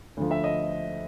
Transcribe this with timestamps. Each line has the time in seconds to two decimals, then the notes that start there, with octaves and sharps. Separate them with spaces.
0.17 D2 D3 F3
0.31 E5
0.44 D#5